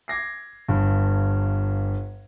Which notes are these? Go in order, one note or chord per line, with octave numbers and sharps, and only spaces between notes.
D6 G#6 A#6 C7
G1 G2